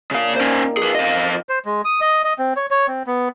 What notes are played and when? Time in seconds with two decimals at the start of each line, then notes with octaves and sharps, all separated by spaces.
0.11 A#2 C#3 D4 F5 A5
0.36 D#3 C#4 G4 C5
0.77 F3 G#4 B4
0.95 F2 F4 D#5
1.13 F5
1.49 C5
1.65 G#3
1.85 D#6
2.01 D#5
2.25 D#5
2.39 C4
2.56 C#5
2.71 C#5
2.88 C4
3.07 B3